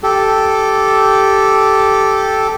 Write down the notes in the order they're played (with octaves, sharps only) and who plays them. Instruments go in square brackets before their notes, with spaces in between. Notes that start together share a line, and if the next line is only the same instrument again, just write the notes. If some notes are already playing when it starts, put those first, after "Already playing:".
[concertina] G4 A4